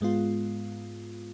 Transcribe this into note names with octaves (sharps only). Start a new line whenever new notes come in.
G#2 G#3 B3 F4